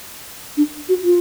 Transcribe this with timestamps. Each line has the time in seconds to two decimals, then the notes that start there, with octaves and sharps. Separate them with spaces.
0.57 D4
0.88 F#4
1.04 F4